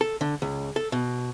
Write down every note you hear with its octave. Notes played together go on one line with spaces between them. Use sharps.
A4
D3
C#2
A4
B2